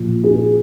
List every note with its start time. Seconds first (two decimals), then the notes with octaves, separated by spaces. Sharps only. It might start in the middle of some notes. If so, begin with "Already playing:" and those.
Already playing: A#2 F3
0.23 G#4